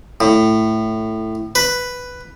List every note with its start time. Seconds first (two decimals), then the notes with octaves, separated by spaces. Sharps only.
0.21 A2
1.55 B4